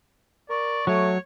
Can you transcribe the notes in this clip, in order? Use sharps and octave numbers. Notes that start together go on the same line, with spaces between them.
A#4 D5 C#6
F#3 A3 C#5